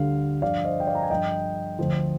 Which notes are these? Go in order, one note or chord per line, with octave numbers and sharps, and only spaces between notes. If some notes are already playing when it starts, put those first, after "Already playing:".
Already playing: D2 D3 G3 F5
G2 D3 F3 D5 F5
C5 D#5
G5
D5 F5
A#5
G#5
G2 F3 D#5 G5
D2 D3 F3